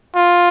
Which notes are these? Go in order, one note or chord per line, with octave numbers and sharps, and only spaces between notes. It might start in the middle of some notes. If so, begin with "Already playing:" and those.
F4